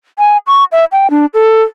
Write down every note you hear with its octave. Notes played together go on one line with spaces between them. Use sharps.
G#5
C#6
E5
G5
D4
A4